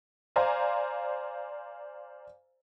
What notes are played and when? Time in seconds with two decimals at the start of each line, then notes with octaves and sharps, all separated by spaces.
0.36 C5 D5 F5 G#5 A#5